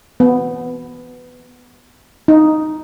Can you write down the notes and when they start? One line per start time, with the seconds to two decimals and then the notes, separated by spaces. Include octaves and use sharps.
0.20 B3
2.28 D#4